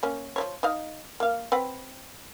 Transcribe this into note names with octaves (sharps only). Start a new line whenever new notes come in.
A#3 C#4
F3 B4 C#5
D#4 D#5 F5
A#3 F5
C4 B4 F#5